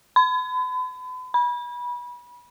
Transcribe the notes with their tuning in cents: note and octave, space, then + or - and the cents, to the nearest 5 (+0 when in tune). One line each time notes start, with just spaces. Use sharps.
B5 +40
B5 -25